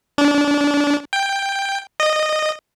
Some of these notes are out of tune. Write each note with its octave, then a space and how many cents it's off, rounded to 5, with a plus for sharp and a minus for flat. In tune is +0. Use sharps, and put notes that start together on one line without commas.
D4 -25
G5 +10
D#5 -15